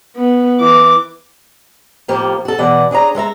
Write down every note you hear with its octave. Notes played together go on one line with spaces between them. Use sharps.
B3
E3 D6
F2 A2 F3 A#3 G4
F#4 A4
B2 E3 D5 F#5
D4 G#4 C#5 A#5
G#3 A4 E5 A#5